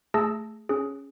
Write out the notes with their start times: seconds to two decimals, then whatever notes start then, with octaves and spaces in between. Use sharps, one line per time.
0.14 A3 G#4 A5 E6 A#6
0.69 C#4 G#4